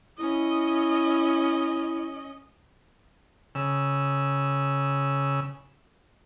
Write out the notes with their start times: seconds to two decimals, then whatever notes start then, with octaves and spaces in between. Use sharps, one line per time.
0.18 C#4 E4 D#5
3.55 C#3 E6